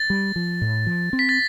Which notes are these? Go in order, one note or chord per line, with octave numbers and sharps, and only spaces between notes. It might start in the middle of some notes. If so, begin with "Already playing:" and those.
Already playing: A6
G3
F3
A2
F3
C4
B6
A6